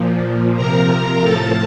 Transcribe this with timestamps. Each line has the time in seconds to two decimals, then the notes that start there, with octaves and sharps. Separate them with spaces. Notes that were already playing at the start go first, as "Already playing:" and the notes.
Already playing: A#2 F3
0.56 C3 F3 A#4 A#5
1.22 A2 F3 A4 A5